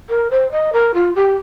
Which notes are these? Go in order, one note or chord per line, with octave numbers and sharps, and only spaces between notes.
A#4
C5
D#5
A#4
F4
G4